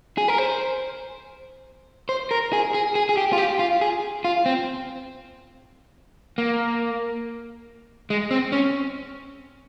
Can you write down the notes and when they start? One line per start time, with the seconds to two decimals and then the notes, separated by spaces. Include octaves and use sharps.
0.18 G#4
0.28 A#4
0.38 C5
2.09 C5
2.31 A#4
2.53 G#4
2.74 G#4
2.95 G#4
3.09 G#4
3.17 G4
3.33 F4
3.38 G4
3.59 F4
3.81 G#4
4.24 F4
4.46 C4
6.38 A#3
8.10 G#3
8.31 C4
8.52 C#4